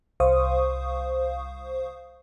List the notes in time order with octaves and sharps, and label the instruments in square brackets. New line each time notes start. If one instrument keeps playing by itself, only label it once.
[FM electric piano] C2 C5 F5 C#6 D#6